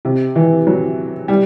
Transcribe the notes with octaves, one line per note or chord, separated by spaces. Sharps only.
C3
E3
F#3
G3